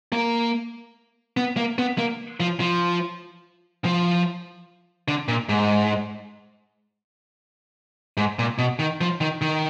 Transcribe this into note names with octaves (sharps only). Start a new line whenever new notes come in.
A#3
B3
A#3
B3
A#3
F3
F3
F3
D3
A#2
G#2
G#2
A#2
B2
D#3
F3
D#3
D#3